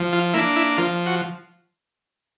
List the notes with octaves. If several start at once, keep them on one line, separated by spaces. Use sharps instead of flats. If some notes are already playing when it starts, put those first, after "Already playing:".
Already playing: F3
F4
A#3 D4 E4
E4
F3 F4
F#4